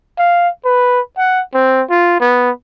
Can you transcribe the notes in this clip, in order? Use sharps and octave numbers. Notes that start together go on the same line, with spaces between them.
F5
B4
F#5
C4
F4
B3